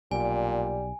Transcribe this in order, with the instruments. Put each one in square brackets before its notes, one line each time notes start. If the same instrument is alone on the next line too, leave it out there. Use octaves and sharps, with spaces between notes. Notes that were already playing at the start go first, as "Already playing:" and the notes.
[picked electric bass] B1 [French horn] A#2 [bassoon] G3 [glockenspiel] G#5